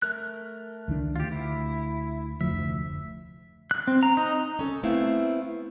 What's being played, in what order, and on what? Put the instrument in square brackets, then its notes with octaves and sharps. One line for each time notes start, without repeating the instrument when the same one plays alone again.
[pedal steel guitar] A3 A#4 F#6
[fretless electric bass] C#2 D#3 D4
[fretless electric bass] D2 [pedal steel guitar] F4 G4
[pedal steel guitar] E4
[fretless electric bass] F1 D2 F3 [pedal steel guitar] E5
[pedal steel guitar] F#6
C4
A#5
D#4
[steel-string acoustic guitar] C#4 A4
A3 B3 C4 E4 F5